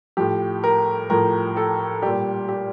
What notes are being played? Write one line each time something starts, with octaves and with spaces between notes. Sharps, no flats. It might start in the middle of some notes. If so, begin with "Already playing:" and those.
A2 F3 G4
A#4
A2 F3 A#4
A4
A#2 G3 G4
G4